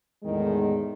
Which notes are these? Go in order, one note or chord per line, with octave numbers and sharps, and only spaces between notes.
E2 A2 D#3 G#3